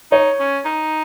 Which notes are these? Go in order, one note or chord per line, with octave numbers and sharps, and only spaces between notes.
D#4 C#5
C#4
D#4